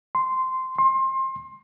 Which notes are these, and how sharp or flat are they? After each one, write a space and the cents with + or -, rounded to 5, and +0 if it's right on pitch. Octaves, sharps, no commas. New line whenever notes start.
C6 -10
C6 +25